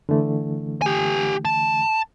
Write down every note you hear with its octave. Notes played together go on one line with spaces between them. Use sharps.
D3 E3 A3
G4 G#5
A5